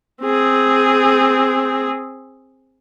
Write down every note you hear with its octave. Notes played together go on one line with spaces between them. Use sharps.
C4 G#4